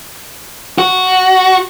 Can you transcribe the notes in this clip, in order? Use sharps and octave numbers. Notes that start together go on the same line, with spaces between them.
F#4